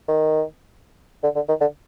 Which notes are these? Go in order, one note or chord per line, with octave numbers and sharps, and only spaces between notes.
D#3
D3
D3
D#3
D3